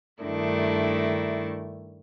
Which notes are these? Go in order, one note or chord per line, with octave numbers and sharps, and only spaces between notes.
G2 D#3 A3 D4 E4